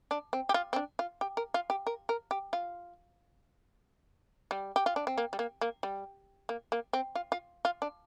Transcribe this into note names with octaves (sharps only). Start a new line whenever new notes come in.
D4
C4
G4
F4
C4
D4
F4
G4
A#4
F4
G4
A#4
A#4
G4
F4
G3
G4
F4
D4
C4
A#3
G3
A#3
A#3
G3
A#3
A#3
C4
F4
F4
F4
D4